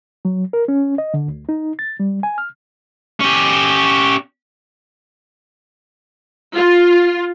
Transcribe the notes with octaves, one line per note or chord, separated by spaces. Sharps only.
F#3
A#4
C#4
D#5
D3
D2
D#4
A6
G3
G#5
F6
C#4 G4
F4